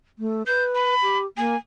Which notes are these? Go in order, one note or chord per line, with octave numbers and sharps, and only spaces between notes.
A3
B4 G6
B5
G4
A#3 G#5